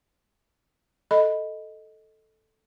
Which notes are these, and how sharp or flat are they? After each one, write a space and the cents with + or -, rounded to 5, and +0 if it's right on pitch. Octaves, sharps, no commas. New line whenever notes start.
A4 +0 D#5 +0 B5 +0